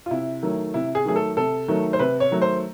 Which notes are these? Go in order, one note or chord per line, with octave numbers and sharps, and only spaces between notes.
F4
C3 E4
D#3 F#3 A3
C3 E4
G#4
D#3 F#3 A3 G#4
A4
C3 A4
D#3 F#3 A3
C5
C3 B4
C#5
D#3 F#3 A3
C5